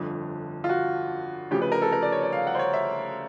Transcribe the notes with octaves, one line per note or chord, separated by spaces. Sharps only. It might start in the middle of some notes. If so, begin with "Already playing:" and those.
Already playing: G1 F2 D3 F3
F4
F#4
D2 C#3 F3 G4
B4
A#4
A4
A#4
D5
C#5
D5
F5
F#5
C5
C#5
E5